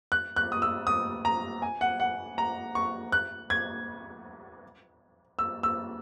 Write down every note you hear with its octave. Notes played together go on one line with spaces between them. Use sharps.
F#6
F#6
D#6
E6
D#6
A#5
G#5
F#5
F#5
A#5
C#6
F#6
G#6
E6
E6